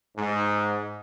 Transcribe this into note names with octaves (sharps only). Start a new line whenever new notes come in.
G#2